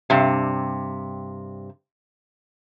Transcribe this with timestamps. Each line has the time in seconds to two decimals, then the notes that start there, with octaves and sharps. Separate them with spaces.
0.10 G2 C3